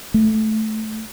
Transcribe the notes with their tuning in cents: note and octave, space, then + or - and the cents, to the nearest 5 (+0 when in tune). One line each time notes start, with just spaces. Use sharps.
A3 -10